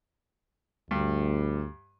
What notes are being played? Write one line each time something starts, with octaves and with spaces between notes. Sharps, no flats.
D2 G2